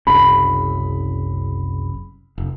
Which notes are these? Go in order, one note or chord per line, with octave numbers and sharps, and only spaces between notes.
F#1 C2 C#3 B5
F1